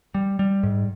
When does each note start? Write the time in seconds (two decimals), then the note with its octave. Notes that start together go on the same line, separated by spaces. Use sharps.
0.15 G3
0.39 G3
0.63 G#2